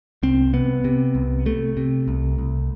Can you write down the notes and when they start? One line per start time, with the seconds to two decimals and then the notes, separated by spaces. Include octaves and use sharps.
0.23 C2 C4
0.53 C3 B3
0.84 C3
1.15 C2
1.46 C3 A3
1.77 C3
2.08 C2
2.39 C2